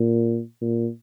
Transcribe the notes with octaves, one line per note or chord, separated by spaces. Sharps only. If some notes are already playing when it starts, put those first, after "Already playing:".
Already playing: A#2
A#2